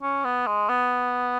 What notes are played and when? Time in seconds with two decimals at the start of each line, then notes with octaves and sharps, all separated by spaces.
0.02 C#4
0.24 B3
0.47 G#3
0.69 B3